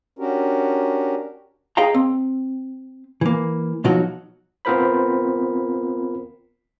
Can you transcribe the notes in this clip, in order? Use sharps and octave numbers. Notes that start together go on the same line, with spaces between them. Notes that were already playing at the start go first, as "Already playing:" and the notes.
C#4 D4 F#4 G4 A#4
G#4 D#5 F5 G5 A#5
C4
E3 A#3
B2 F3 F#3 D#4 F#4
B3 C4 F4 A#4 C5 B5